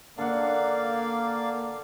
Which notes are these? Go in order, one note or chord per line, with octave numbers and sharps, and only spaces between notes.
D3 A#3 D5 F5 F#5